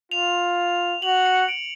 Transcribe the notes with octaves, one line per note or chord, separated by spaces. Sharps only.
F4 F7
F#4 F#7
C#7
D7